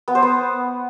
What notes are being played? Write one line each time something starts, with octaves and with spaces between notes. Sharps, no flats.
B3
C5
B3